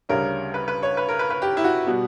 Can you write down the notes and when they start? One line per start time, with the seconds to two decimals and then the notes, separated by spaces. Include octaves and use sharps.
0.09 D2 C#3 G3 C#4 A#4
0.54 B4
0.68 B4
0.83 C#5
0.97 B4
1.09 A#4
1.19 B4
1.30 B4
1.42 G4
1.57 E4
1.64 F#4
1.86 B2 G3 B3